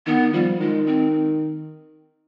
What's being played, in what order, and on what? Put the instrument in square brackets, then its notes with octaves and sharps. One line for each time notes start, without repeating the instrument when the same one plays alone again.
[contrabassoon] D#3 [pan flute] B3
[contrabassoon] F3 [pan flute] G3
[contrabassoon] D#3 [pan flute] G#3
[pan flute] C4